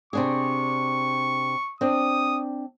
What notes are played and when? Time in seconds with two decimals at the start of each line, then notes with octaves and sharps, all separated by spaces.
0.13 C3 D4 G#4 C#6
1.81 C4 D4 D#6